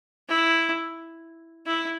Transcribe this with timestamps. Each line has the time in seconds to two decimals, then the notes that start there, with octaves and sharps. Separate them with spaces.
0.29 E4
1.66 E4